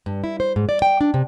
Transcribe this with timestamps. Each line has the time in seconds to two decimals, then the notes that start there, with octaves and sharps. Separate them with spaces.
0.06 G2
0.24 E4
0.40 C5
0.56 G#2
0.69 D5
0.82 G5
1.01 D4
1.14 C3